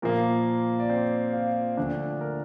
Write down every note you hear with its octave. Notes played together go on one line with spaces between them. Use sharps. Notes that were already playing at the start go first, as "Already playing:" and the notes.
A#2 F3 A#3 A#4
D5
C4 C5
F4 F5
D2 D3 F3 D4 D5
A#4